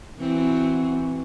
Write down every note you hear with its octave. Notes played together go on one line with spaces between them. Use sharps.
E3 C4 F#4